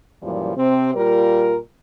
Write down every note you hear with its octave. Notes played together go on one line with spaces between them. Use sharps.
F#2 A#2 E3 F3 G3
C3 C4
A#2 G3 F4 A#4